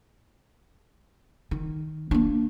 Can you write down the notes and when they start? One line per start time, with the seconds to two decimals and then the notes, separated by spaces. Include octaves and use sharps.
1.51 D#3
2.11 A#3 D4